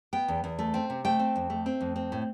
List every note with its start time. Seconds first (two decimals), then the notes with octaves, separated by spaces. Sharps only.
0.13 B3 G5
0.28 E2
0.44 E2
0.59 A3
0.74 C4
0.90 C3
1.05 A3 G5
1.19 C4
1.36 F2
1.50 A3
1.66 C4
1.81 F2
1.96 C4
2.12 A2